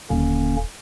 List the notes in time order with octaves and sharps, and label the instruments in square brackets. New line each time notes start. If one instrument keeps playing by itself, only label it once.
[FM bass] D#1 [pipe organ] D3 A#3 C#4